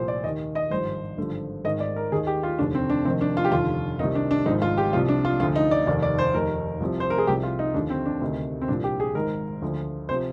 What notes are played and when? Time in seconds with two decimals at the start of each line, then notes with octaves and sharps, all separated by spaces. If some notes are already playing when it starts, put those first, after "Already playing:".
Already playing: C2 A#2 F3 C5
0.08 D5
0.24 D#2 D#3 D#5
0.55 D#5
0.71 G#1 G2 F3 C5
1.17 G#1 G2 D3 F3
1.64 G#1 G#2 D#3 D#5
1.80 D5
1.96 A#4
2.12 D#2 D#3 G#4
2.27 G4
2.43 F4
2.59 F1 D#2 D3 D4
2.75 C4
2.90 D4
3.05 F1 F2 D#3 C4
3.21 D4
3.37 F4
3.45 G4
3.52 F1 D#2 D3 F4
3.99 C2 C3 D#3 D#4
4.15 D4
4.31 D4
4.46 G#1 G#2 F3 D#4
4.62 F4
4.77 G4
4.93 C2 C3 F3 F4
5.08 D4
5.25 F4
5.40 D2 D3 F3 F4
5.56 D#4
5.71 D5
5.87 F1 D#2 D#3 D5
6.02 D5
6.18 C5
6.34 F1 D#2 D#3 A#4
6.80 C2 C3 F3
7.00 C5
7.10 A#4
7.18 G#4
7.27 C2 C3 F3 G4
7.43 F4
7.59 D#4
7.74 D#2 D3 F3 D4
7.90 C4
8.06 D4
8.21 D2 C3 D#3
8.61 C4
8.68 C2 A#2 F3 D4
8.84 G4
9.00 G#4
9.15 G#1 G#2 D#3 A#4
9.62 D2 D3 F3
10.09 C3 F3 C5